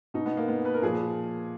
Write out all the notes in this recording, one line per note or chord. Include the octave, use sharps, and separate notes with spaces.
B2 D#4
B3
A#3
B3
B4
A#4
A#2 F3 G#4